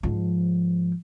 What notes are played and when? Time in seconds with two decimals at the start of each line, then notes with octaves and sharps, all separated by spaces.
0.03 G#2 F3